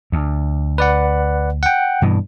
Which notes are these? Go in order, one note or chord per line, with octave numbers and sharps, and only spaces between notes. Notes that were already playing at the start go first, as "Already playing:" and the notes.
D2
B4 D5 F#5
F#5 G5
G2 B2 E3